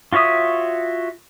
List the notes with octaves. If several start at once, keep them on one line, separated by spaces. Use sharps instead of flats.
F4 F#4 C#5 E5 D#6